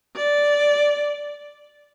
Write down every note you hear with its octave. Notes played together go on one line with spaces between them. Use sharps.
D5